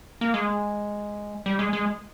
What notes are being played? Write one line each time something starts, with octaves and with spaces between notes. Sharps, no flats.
A#3
G#3
G3
G#3
G#3